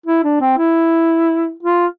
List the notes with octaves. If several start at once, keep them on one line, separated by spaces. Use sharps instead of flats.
E4
D4
C4
E4
F4